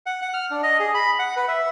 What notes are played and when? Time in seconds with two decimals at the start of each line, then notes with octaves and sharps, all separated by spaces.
0.06 F#5
0.22 F#5
0.34 F6
0.51 D4
0.63 D#5
0.80 G#4
0.94 B5
1.19 F#5
1.37 B4
1.48 E5